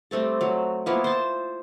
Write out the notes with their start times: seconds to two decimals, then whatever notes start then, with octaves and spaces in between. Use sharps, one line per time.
0.11 G3 A3 C4 A4
0.41 F#3
0.86 F3 A#3 B3 E4
1.04 C5 A5